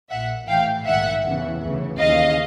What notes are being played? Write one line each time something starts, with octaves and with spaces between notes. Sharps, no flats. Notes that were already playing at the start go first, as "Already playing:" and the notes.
A#1 A#2 E5 F#5
A1 A2 E3 F5 G5
A#1 G#2 D#3 E5 F#5
E2 C#3 E3
D2 C#3 E3
D#2 C#3 E3 D#5 F5